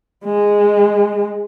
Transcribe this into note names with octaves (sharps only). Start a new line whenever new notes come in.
G#3